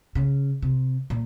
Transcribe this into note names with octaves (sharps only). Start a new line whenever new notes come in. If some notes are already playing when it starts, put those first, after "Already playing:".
C#3
C3
A#2